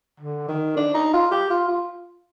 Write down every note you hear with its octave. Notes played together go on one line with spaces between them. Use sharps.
D3
D#3
D4
D#4
F4
G4
F4
F4